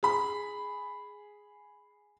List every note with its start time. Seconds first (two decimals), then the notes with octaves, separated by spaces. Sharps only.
0.03 G#4 B5